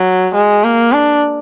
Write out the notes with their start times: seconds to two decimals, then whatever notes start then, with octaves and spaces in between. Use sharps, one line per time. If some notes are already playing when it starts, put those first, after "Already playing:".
Already playing: F#3
0.35 G#3
0.64 A#3
0.93 D4